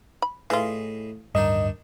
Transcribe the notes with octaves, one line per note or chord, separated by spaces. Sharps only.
B5
A2 E3 F4 G#4 D#5
D1 G2 D#3 D4 D#4 D#5